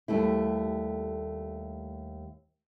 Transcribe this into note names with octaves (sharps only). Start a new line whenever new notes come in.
D#2 G3 A3 E4